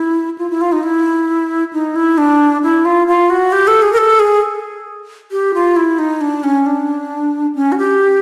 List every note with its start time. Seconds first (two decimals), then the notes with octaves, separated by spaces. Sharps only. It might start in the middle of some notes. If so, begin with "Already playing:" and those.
Already playing: E4
0.38 F4
0.50 E4
0.61 F4
0.72 D#4
0.83 E4
1.73 D#4
1.96 E4
2.18 D4
2.63 E4
2.85 F4
3.07 F4
3.30 F#4
3.52 G4
3.67 A4
3.82 G#4
3.93 A#4
3.97 A4
4.19 G#4
5.31 G4
5.54 F4
5.76 E4
5.98 D#4
6.21 D4
6.43 C#4
6.66 D4
7.55 C#4
7.72 F#4
7.78 G4